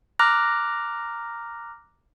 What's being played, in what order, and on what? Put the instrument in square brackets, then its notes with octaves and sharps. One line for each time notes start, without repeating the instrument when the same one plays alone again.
[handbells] A#5 D6 F6 F#6 A#6